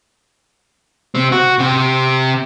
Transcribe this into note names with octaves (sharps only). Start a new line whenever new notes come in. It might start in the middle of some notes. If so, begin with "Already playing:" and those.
C3 C4
F#4
C3 G4